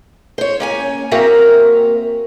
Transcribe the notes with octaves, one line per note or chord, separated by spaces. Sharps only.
C5 C#5
A#3 C#4 G#5
A#3 C4 F#4 A#4 E5 F5